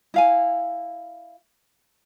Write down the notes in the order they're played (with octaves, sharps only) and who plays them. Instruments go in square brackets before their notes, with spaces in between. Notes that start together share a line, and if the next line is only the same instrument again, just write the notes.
[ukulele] E4 F5 G#5